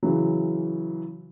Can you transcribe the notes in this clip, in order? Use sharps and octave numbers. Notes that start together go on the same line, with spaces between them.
C#3 E3 F#3